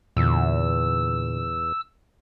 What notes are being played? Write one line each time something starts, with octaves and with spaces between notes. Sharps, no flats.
E2 A#2 D3 E6